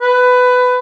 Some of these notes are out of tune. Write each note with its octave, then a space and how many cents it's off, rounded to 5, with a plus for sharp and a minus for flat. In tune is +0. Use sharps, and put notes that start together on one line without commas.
B4 +15